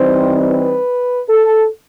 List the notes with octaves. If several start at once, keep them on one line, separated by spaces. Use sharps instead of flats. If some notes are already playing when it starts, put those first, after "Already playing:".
Already playing: E3 G3 C4 D#4 C5
B4
A4